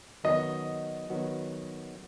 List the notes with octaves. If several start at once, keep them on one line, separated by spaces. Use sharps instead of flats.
D#3 F#3 B3 F#4 D#5
D#3 F#3 B3 F#4